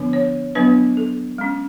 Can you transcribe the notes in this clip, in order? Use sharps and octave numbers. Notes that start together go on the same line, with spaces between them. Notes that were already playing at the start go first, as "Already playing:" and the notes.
Already playing: D3 F3 B3 D4
C#5
F#3 B3 D4 B4
A4
G#3 C#4